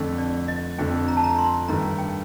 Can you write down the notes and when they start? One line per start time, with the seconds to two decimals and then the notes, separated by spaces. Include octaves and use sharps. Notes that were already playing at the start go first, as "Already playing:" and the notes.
Already playing: F2 D3 A3
0.18 D5
0.48 D#5
0.79 F2 D3 A3 G5
1.08 A#5
1.17 A5
1.24 A#5
1.38 C6
1.68 G2 D#3 A3 A#5
1.98 G5